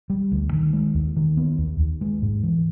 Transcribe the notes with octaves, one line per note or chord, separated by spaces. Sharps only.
G3
D2
D#3
G#3
D#2
D#3
B3
D#2
D#2
G#3
G#2
E3